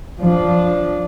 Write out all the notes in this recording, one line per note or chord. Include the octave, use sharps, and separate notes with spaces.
F3 D4